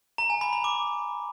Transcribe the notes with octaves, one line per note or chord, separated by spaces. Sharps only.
A#5
G#5
B5
B5
D6